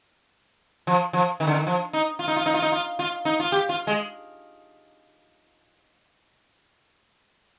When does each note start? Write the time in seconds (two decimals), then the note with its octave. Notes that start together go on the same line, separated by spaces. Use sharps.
0.87 F3
1.13 F3
1.40 D#3
1.47 D3
1.54 D#3
1.67 F3
1.93 D#4
2.19 F4
2.28 D#4
2.36 F4
2.46 D#4
2.54 F4
2.62 D#4
2.72 F4
2.99 F4
3.25 D#4
3.40 F4
3.52 G4
3.69 F4
3.87 G#3